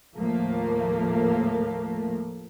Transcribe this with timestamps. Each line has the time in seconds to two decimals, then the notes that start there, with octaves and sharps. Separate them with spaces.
0.15 D#2 A2 F3 A3 A#3